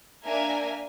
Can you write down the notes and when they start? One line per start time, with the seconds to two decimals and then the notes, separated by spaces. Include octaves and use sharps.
0.24 A#3 D4 A#4 E5 G#5